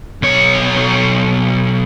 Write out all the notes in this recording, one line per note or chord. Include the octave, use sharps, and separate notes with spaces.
B1 C#5